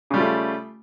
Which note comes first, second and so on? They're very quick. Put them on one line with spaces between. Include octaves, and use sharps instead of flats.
C#3 G3 F4 A3